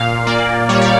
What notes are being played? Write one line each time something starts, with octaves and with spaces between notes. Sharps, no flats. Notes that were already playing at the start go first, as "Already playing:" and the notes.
Already playing: A#2 F5
A#3 D5
G3 C#5
D5